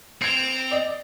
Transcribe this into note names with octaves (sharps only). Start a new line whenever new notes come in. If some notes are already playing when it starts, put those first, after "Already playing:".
C4 G#6 C7 D7 F7
D5 D#5